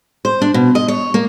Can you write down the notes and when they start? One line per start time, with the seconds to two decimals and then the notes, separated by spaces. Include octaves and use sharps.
0.25 C5
0.42 D4
0.54 B2
0.75 D#5
0.88 C#5
1.14 A#3